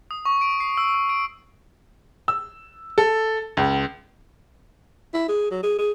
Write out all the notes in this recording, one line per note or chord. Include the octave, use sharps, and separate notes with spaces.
D#6
C#6
D7
C7
E6
E6
D7
E6
A4
C#2
E4
G#4
F#3
G#4
G#4